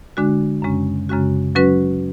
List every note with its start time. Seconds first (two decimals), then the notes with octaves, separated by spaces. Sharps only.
0.17 D3 G#3 D4 F#4
0.62 F#2 C#3 G#3 C#4
1.09 F#2 C#3 G#3 C#4 F#4
1.55 F#3 C#4 F#4 B4